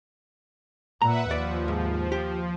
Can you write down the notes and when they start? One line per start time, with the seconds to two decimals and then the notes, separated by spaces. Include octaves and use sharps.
1.02 A#2 B4 E5 F#5 A#5
1.31 D#2 F3 D5
1.68 G#2
2.12 G4